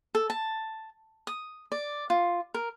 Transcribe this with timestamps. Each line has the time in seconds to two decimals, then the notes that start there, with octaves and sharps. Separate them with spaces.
0.15 A4
0.30 A5
1.27 D#6
1.72 D5
2.10 F4
2.54 A#4